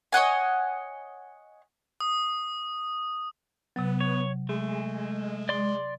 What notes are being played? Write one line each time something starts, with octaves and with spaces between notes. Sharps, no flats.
C#5 D#5 F#5 G#5
D#6
C3 F#3 B3
C#5
G#3 A3
D5 C6